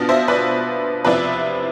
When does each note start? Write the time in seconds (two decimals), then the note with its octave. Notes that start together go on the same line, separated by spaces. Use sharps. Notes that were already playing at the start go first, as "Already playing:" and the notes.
Already playing: B2 B3 D4 F4
0.09 C5 E5
0.28 B4 D5
1.05 C3 F3 C4 E4 B4 D5